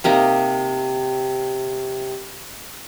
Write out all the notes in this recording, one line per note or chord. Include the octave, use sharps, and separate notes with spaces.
C3 A#3 D#4 A#4